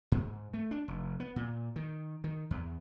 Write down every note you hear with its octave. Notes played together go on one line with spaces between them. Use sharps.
G#2
A3
D4
F1
B3
A#2
D#3
D#3
E2